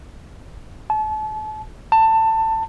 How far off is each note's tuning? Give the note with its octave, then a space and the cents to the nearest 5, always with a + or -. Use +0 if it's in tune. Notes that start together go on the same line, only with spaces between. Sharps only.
A5 -35
A5 +20